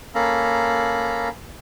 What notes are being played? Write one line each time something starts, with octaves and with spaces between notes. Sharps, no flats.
A#3 C#4 A4 F5 A#5 B5